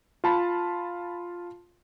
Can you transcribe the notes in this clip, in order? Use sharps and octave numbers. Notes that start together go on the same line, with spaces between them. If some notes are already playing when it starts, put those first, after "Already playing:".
F4 A5 B5